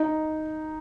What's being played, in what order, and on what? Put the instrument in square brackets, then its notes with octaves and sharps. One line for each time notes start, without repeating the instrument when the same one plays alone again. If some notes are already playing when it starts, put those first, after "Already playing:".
Already playing: [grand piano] D#4